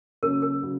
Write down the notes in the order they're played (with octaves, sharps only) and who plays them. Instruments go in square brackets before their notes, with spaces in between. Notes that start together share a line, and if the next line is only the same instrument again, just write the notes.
[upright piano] C#3 F#3 A#3 C#4 [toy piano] A#4
[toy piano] A#4
[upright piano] C#3 F#3